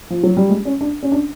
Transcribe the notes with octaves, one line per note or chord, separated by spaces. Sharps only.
F3
F#3
G3
G#3
C#4
D4
C#4
D4